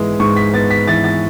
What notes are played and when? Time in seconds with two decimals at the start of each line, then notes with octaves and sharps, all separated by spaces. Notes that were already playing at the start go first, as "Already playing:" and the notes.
Already playing: G#2 E3 G#3 B3
0.20 G#2 C#6
0.37 B6
0.54 B3 A6
0.71 B6
0.87 E3 A6
1.04 A6